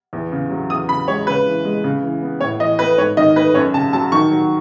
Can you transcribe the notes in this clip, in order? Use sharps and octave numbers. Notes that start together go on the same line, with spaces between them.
E2
C#3
F#3
E2 D#6
C#3 B5
G#3 C#5
C#3 B4
E3
G#3
C#3
E3
B3
A2 C#5
E3 D#5
A3 B4
G#2 C#5
D#3 D#5
A3 B4
F#2 C#5
C#3 A5
F#3 A5
D#3 C#6
F#3